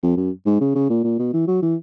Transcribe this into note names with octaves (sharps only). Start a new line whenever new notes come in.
F2
F#2
G#2
C#3
C#3
A#2
A#2
B2
E3
F#3
E3